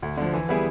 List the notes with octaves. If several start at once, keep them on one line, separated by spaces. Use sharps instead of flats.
D2
D3 F3
E3
G3 B3 E4 G#4